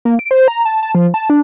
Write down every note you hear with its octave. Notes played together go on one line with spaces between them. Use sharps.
A#3
D7
C5
A#5
A5
A5
F3
A5
D4